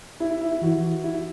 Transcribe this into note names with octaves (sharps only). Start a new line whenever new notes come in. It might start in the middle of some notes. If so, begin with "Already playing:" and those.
E4
E4
E3 F#4
E4